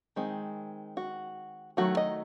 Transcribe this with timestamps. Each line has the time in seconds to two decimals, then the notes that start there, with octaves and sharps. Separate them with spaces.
0.16 D#3 G#3 C4
0.97 F#4
1.77 D#3 F#3 A3 F#4
1.97 D#5